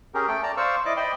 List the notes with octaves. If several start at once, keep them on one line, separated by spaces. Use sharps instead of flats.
C#4 G4 G#4 A#4
A3 A4 G5
D5 A5 A#5
C5 D5 F5 C#6 E6
E4 D5 D#5 D6
C5 D5 D#5 G5 B5 C6